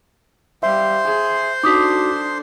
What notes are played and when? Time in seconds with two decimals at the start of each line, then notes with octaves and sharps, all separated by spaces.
0.63 G3 C5 E5 F5 C6
1.05 G#4
1.64 D4 D#4 F#4 A4 D6 D#6 B6